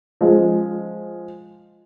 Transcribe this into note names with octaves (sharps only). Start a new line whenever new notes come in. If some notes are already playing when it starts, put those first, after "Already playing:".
F3 G#3